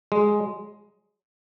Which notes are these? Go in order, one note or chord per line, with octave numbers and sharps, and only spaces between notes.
G#3